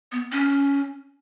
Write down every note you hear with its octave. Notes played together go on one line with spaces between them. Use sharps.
B3
C#4